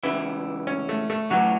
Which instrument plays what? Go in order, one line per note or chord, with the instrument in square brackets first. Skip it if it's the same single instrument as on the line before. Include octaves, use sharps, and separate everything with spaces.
[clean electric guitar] C#2 C#3 E3 [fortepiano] E4
[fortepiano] C#4
A3
A3
[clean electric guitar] A2 E3 B3 F#4 [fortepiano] F#3